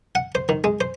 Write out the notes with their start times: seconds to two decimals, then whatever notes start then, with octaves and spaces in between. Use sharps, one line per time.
0.15 F#5
0.35 C5
0.49 D#3
0.64 G#3
0.81 C5